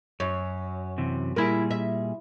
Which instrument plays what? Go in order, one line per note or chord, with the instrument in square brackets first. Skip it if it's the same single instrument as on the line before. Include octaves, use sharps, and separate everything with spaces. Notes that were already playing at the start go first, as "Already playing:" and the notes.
[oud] F#2 [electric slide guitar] C#5
[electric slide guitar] C3 E3
[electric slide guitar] A#2 G3 G#4 [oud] E4 A#4
[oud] E5